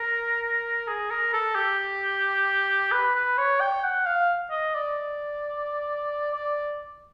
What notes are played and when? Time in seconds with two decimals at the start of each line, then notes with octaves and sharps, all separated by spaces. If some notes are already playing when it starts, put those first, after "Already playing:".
Already playing: A#4
0.88 G#4
1.10 A#4
1.33 A4
1.55 G4
2.92 B4
3.15 B4
3.38 C#5
3.61 G5
3.84 F#5
4.06 F5
4.51 D#5
4.74 D5
6.34 D5